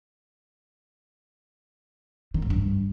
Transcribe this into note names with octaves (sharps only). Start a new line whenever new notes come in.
D#3
G#2
G2